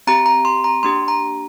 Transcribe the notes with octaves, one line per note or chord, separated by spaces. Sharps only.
C4 G4 A#5
A#5
C6
A#5
A#3 D4 G4 C6
A#5